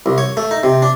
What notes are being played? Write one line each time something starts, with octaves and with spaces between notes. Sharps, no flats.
C2
C#5
A3
D#4
C3
D4